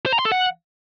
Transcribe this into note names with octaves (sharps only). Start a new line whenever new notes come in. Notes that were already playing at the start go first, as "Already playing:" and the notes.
C5
A#5
C6
A4
F#5